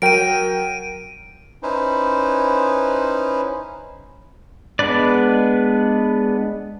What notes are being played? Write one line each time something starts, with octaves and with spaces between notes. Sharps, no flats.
F#3 A#4 G5 D7 D#7
C#4 D#4 E4 B4 C5
G#3 B3 D4 B4 D5